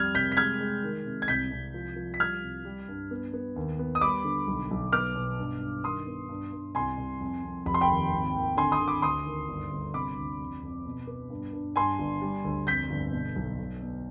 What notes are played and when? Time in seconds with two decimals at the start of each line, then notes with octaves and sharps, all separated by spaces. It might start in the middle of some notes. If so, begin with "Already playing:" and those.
Already playing: F2 G3 F6 G#6
0.15 C3 G6 B6
0.32 B6
0.37 G#3 F6 G#6
0.60 G#3
0.83 D#3
1.06 C3
1.22 G#6
1.28 C2 G6 B6
1.51 C2
1.74 F3
1.96 F3
2.14 B6
2.19 G3 F6 G#6
2.43 C2
2.65 G3
2.88 G2
3.11 B3
3.33 B3
3.56 D#2
3.79 B3
3.95 D#6
4.01 G3 B5 D6
4.25 D3
4.47 B1
4.71 B1
4.92 B3 D6 F6
5.16 B2
5.38 G2
5.61 G2
5.84 D#3 C6 D#6
6.07 B3
6.29 G2
6.53 G2
6.75 C2 G#5 C6
6.98 C2
7.21 F2
7.44 F2
7.66 F1 B5
7.74 C6
7.81 G5 B5
7.89 D#2
8.12 G#1
8.34 G#1
8.57 D3 G#5 C6
8.72 C6 D#6
8.80 D3
8.88 B5 D6
9.02 D2 C6 D#6
9.26 D#3
9.48 G1
9.71 G1
9.94 C3 B5 D6
10.16 D2
10.40 F2
10.63 F2
10.85 B2
11.07 B3
11.30 G2
11.53 G2
11.76 G2 G#5 C6
11.99 G1
12.22 G3
12.44 D2
12.67 F2 G6 B6
12.90 G1
13.13 B2
13.36 B1
13.58 B2
13.82 B2